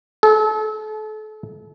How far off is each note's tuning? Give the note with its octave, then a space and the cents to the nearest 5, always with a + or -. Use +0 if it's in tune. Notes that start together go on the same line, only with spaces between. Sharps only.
A4 -35